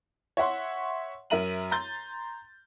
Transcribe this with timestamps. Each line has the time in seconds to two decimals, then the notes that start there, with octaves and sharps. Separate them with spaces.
0.37 C#5 E5 F#5 C6
1.30 F#2 A#4 E5 A#5 D#7 F#7
1.71 A#5 C6 G6 A6